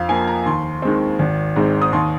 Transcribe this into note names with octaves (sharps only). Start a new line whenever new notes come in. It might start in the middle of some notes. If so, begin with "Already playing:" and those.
Already playing: F2 F5
F3 A#3 G#5
A#5
D#2 C6
D#3 G#3 C4
G#1
G#2 G#3 C4
D#6
D#2 C6